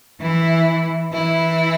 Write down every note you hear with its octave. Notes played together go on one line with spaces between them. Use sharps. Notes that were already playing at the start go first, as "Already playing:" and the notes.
E3 E4
E3 E4